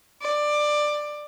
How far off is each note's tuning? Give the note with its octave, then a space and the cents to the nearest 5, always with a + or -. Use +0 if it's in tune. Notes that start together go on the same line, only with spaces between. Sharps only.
D5 +15